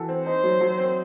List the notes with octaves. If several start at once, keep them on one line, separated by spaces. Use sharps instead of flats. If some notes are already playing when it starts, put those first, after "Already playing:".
Already playing: E3 F#4 A4
C4
D#4 C5
F#3
F#3
C4